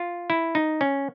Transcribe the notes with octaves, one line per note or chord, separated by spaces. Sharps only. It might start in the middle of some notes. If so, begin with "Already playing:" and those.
Already playing: F4
E4
D#4
C#4